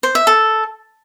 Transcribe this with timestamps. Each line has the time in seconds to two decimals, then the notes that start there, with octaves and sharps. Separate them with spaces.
0.03 C5
0.15 E5
0.27 A4